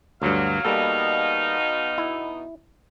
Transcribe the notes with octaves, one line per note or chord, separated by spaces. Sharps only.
D2 G2 F#3 F5
B2 G3 A#3 D#4 A4
E4